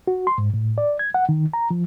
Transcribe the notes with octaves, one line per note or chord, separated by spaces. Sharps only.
F#4
C6
G#2
A2
D5
G#6
F#5
D#3
A#5
F3